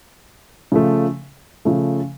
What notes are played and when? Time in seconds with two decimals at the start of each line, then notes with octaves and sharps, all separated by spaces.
0.72 C#3 F3 A3
1.65 C#3 F3 A3